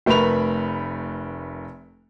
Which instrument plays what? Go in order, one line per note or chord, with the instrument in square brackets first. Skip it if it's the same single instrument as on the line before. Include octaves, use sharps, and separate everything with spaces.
[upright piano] F1 A3 A#4 B4 B5 F7